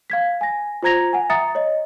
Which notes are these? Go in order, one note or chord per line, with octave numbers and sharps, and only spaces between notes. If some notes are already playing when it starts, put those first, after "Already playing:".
F5 G#6 B6
G#5 A#6
F4 C5 A#5 G#6 A#6 F7
F#5 G#5
E5 A#5 D#6 A6 C#7
C#5 D#5